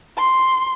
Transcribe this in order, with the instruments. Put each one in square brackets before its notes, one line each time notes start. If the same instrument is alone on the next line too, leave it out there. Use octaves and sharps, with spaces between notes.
[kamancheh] C6